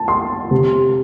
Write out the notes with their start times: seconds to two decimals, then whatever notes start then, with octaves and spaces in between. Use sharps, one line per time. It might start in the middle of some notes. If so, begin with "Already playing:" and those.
Already playing: A5
0.08 C6
0.51 C3